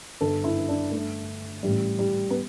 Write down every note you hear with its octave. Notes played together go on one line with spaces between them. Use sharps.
G1 G2 D3 A4
E4
D4
G1 G2 D3 A3
A1 A2 E3 G3
G3
B3